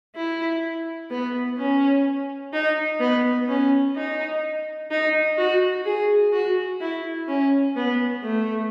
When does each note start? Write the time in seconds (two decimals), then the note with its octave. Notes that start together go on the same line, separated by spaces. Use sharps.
0.15 E4
1.11 B3
1.58 C#4
2.53 D#4
3.00 B3
3.49 C#4
3.95 D#4
4.91 D#4
5.38 F#4
5.85 G#4
6.33 F#4
6.81 E4
7.28 C#4
7.76 B3
8.23 A3